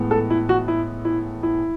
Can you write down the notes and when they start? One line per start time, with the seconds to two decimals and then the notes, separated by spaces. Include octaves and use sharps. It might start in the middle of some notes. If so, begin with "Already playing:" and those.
Already playing: A2 E3 G#3 B3
0.11 A4
0.30 E4
0.49 F#4
0.68 E4
1.05 E4
1.43 E4